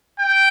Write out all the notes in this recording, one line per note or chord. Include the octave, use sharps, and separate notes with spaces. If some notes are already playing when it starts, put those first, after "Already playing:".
G5